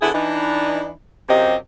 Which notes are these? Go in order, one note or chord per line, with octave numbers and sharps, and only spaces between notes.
D3 B3 E4 G#4
E3 D4 D#4
F#2 C3 C4 F4 G4 D#5